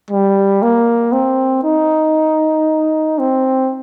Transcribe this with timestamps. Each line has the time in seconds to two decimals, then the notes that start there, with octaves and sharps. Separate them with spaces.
0.11 G3
0.62 A#3
1.12 C4
1.64 D#4
3.18 C4